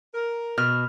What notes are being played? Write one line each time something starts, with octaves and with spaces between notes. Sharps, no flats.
A#4
B2 F6